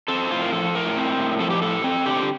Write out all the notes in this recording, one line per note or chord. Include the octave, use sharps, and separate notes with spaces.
C4 A4
A2 F4
A#4
F3 A4
A2 A#4
C4
A2
F3 A4
G4
A2 A4
C4
D3 G4